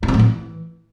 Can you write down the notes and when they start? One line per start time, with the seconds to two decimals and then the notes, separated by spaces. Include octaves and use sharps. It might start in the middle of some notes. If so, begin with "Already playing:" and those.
0.03 G2
0.08 C3
0.14 A2
0.19 E3